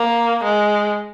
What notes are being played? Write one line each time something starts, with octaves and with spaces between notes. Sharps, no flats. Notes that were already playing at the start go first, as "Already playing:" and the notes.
Already playing: A#3
G#3